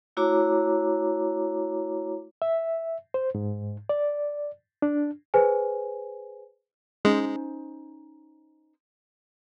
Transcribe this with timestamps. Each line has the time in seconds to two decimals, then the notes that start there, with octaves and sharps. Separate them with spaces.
0.17 A3 E4 F#4 C#5 A#5 D6
2.42 E5
3.14 C5
3.35 G#2
3.89 D5
4.82 D4
5.34 G#4 B4 C5 G#5
7.05 G#3 C#4 D#4 C5